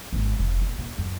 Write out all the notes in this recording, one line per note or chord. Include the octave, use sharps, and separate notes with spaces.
G#1 C#4
F1
A#2
A#2
F#2